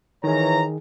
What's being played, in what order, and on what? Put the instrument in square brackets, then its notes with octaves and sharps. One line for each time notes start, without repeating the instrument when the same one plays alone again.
[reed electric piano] D#3 G#4 [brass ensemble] E3 C#5 A#5